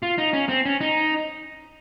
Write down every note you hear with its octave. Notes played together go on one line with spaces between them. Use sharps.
F4
D#4
C#4
C4
C#4
D#4